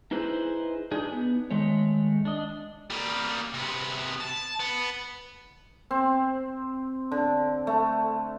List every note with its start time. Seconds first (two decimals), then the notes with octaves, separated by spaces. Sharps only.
0.11 D#4 E4 G#4 B4 C5
0.91 D4 D#4 G#4
1.12 B3
1.51 D#3 G#3 A3 C#5
2.25 D4 D#5
2.90 G3 A#3
3.54 C3 B3
4.20 A5
4.59 B3
5.91 C4
7.12 D3
7.67 A3